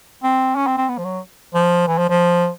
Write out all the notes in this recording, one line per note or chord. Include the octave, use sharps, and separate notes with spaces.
C4
C#4
C4
C4
B3
F3
F#3
F3
E3
F3
F3